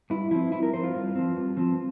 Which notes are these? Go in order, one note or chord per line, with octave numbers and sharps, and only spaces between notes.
G2 E4
F3 C4 E4
G2 E4
A#4
F3 C4 C5
F4
G2
F3 C4
G2
F3 C4